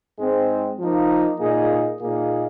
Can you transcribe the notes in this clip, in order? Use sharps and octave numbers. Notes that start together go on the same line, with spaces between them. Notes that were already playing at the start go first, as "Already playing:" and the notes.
G#2 G#3 C4
F3 A#3 D#4
A#2 A#3 D#4 G#4
A#2 A#3 D#4 G#4